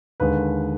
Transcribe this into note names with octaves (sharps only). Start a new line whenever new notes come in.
D#2 D3 G#3 B4